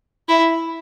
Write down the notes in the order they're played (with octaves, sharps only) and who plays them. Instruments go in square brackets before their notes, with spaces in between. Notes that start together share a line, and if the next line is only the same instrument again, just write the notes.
[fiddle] E4